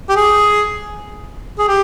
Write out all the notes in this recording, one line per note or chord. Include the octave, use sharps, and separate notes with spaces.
G4
G#4
G#4
G4